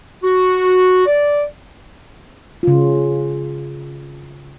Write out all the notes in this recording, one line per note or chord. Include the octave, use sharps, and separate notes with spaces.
F#4
D5
C#3 F4